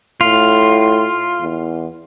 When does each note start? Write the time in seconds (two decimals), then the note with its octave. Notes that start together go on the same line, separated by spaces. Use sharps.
0.21 A2 F4
1.41 E2